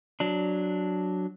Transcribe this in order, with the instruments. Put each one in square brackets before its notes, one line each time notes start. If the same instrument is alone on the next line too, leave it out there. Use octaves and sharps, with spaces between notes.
[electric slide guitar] F#3 D4